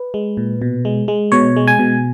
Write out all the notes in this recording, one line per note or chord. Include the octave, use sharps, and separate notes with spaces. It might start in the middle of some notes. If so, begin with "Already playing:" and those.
Already playing: B4
G#3
A#2
B2
G#3
G#3
B2 C#5
G#3
G#5
B2